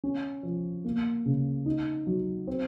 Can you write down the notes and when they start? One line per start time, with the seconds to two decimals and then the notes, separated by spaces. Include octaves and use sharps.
0.04 C#4
0.43 F3
0.85 A#3
1.25 C#3
1.66 D#4
2.07 F#3
2.47 C4